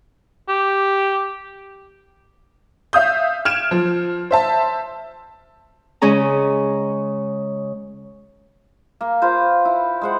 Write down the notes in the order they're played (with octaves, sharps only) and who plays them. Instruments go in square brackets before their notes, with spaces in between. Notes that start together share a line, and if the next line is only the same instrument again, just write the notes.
[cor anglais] G4
[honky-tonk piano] E5 F5 D#6 G6
F6 G#6 D7 E7
F3
C5 E5 A5
[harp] C#3 G#3 C#4 G#4 A#5
[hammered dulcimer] A#3
F4 B4 C5
E4
G#3 C5 F#5